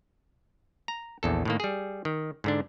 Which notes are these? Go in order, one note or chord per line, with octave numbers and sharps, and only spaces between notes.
A#5
A#1 E2 A4
A2 D#3 A#3
G3 G#4
D#3
G#2 D3 D4